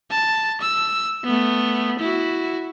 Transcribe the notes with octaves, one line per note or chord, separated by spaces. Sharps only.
A5
E6
A3 B3
E4 F#4